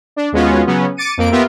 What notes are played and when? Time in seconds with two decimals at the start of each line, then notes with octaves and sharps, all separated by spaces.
0.16 D4
0.32 D#2 G#3 B3 C#4 F4 F#4
0.67 C#3 F#3 B3 C#4
0.97 D6 A6 C#7 D#7
1.17 F2 A#3 D7
1.31 B3 F4 G4 A#4 E5